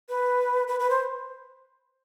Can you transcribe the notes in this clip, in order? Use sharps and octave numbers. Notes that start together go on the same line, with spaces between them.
B4
B4
B4
C5